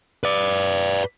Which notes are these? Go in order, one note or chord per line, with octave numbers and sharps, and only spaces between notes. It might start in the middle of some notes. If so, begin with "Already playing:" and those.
B4 D5